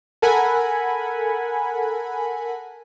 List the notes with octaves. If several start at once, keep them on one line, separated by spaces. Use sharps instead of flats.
A4 A#4 F#5 G#5 B5